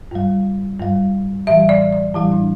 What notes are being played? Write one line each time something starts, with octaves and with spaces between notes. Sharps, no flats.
G2 G3
G2 G3
A2 E3 G3 E5
D5
D5
A2 E3 G3 E4
D4